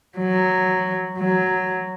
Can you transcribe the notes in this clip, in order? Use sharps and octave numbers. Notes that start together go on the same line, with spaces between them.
F#3
F#3